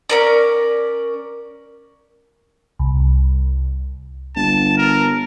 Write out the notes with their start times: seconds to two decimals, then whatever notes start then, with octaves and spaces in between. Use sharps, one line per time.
0.09 C#4 A#4 D5
2.79 C2
4.36 G1 A5
4.78 A#4